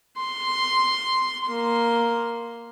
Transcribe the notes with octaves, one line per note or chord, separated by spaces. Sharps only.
C6
A#3 C6